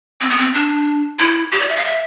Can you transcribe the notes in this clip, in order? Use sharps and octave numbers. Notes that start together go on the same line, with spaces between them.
C4
B3
C4
D4
E4
G4
D5
E5
F5
E5